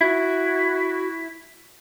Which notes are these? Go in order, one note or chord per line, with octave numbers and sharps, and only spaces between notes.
E4 F#4